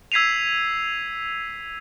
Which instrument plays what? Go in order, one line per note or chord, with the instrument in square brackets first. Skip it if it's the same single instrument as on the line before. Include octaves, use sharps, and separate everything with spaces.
[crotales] E6 G#6 B6 C7 D#7 F7